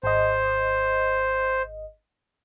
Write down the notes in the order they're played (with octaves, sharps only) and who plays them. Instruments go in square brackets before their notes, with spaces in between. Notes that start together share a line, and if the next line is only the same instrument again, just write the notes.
[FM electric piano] G#1 D#5 [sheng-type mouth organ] C5